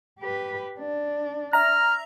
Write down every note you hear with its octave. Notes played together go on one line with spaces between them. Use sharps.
G4 B4
D4
E5 A#5 F6